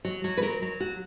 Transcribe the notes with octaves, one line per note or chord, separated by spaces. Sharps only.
F#3
F#3
B4
F#3 A#4
F#3
F#4